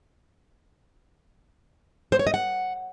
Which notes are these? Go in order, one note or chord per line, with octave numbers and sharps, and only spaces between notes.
C5
C#5
D#5
F#5